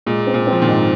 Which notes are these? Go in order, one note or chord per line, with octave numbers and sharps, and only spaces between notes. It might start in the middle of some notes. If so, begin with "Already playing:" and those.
A#2 G#3
C4
A#2
C4
F3
A#2 D#3
G#2